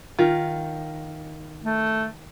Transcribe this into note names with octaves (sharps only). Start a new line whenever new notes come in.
D#3 F4
A3